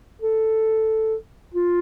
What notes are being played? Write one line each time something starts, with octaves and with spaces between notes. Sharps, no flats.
A4
F4